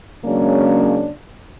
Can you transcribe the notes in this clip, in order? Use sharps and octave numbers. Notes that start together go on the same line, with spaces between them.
C#3 F#3 G#3 A#3 C#4 D4